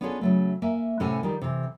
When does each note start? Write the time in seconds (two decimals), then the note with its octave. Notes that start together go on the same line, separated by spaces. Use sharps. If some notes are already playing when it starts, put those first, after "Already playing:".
0.01 B3 C#4 D4 F4 G#4 A4
0.21 C#3 F#3 A3
0.62 A#3 E5 G#5
1.00 A2 C3 C#4 A4 F#5 G#5
1.23 D#3 F3 G3
1.42 C3 E3